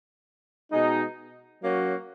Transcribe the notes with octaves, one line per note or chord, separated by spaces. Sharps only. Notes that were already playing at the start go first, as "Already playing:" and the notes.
B2 G#3 D#4
F#3 A#3 C#4 F#4